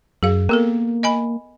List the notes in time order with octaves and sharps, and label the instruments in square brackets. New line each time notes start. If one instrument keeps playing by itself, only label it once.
[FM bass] F#2 [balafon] G#4 F5
[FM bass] A#3 [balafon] B3 A4 A#4
[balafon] D#5 G#5 B5